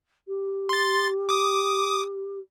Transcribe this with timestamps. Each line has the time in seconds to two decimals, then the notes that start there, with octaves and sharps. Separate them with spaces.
0.28 G4
0.69 C6 A6
1.29 D6 D#6